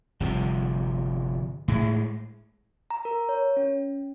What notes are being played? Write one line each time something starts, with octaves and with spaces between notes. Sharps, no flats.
G1 C3 F3
A2 G#3
A#5
A#4
C#5
C#4